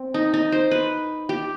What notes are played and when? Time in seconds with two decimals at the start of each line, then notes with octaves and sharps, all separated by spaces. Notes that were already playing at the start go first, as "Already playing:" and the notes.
Already playing: C4
0.14 D#4
0.34 D#4
0.52 C5
0.71 B4
1.29 G4